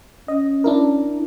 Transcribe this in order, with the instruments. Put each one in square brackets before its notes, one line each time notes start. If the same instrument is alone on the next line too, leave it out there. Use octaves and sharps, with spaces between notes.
[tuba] C#4 [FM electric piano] D#5
[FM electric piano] D4 E4 A#4